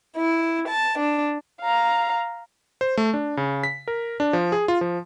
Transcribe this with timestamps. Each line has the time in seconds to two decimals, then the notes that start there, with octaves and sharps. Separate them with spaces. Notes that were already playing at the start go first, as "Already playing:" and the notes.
0.19 E4
0.71 A5
1.01 D4
1.61 F5 A#5
2.81 C5
2.97 A3
3.14 D4
3.37 C#3
3.64 B6
3.88 A#4
4.20 D4
4.33 F3
4.52 G#4
4.68 F4
4.81 F3